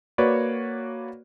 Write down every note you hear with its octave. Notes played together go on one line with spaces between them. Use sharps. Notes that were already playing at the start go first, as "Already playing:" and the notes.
A#3 F#4 B4 C#5 D5